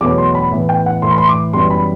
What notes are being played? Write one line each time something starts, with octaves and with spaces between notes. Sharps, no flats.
E2 B2 F#3 A3 D6
C6
B5
A2 E3 B3
G5
F#5
A2 E3 A3 C6
B5
C6
D6
F#2 E3 G3 B3 C6
B5